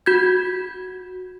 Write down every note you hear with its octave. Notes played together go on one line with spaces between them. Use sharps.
F#4 G6 G#6